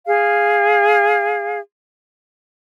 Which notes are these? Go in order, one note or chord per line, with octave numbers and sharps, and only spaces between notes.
G#4 F5